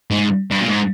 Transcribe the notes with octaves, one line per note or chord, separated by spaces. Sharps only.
G#2
G2
A#2
G#2